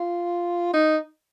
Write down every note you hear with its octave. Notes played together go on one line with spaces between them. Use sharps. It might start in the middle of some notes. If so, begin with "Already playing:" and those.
Already playing: F4
D#4